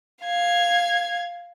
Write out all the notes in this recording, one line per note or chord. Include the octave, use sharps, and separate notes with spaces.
F5 G#6